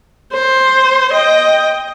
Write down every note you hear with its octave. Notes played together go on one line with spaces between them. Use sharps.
C5
D#5 G5